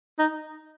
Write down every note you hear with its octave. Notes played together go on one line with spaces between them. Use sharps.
D#4